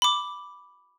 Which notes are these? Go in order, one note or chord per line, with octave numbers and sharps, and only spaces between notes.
B5 D6